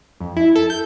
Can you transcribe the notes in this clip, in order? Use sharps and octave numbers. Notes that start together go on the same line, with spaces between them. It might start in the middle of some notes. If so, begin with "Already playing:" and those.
F2
E4
A4
G6